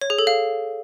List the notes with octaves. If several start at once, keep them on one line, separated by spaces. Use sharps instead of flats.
C#5
G#4
A4
F5